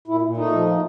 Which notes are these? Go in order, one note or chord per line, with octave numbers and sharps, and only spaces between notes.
A#2 E4
A#2
A3 D#4
F3
A#2